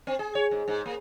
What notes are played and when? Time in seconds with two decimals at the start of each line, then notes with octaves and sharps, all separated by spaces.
0.07 C4
0.19 G#4
0.35 C#5
0.51 G#2
0.68 G#2
0.86 A#3